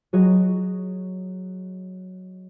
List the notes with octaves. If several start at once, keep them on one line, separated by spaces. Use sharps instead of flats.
F#3 F#4 G#4 C#5 D#5